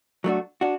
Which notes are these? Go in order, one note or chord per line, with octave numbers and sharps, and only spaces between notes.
F#3 A3 D4 F#4
D4 F#4